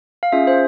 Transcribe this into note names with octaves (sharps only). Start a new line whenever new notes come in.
F5
C#4 F4 G#4 E5
C5